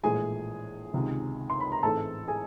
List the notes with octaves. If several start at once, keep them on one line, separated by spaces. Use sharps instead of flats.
A#1 A2 E3 G#3 G#4 G#5
C#2 C3 D#3
C6
B5
A#5
A1 G#2 E3 G#3 C4 A4 A5
G#4 G#5